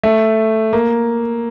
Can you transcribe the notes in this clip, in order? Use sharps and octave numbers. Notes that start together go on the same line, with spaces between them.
A3
A#3